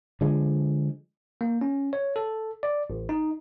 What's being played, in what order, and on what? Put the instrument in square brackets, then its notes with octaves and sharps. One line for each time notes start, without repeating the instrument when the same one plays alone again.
[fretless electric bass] D3 F3 G#3
[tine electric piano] A#3
C#4
C#5
A4
D5
A1
D#4